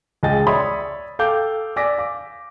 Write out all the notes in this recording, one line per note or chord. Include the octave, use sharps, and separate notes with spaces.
C#2 G#3 D#5 G5 A6
C#5 D5 E5 B5 C6 D#6
A4 F5 G5 D6 G6
D5 G#5 D6 E6 A#6 B6
F5 D6